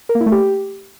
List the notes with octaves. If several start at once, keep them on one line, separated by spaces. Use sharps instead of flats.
A#4
A#3
E4
A3
G4